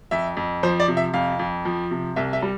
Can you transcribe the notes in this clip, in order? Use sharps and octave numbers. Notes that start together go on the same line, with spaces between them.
F2 E5
F2
F3 C5
D5
C3
E5
F2 F5
F2
F3
C3
C2 E5
E5
G3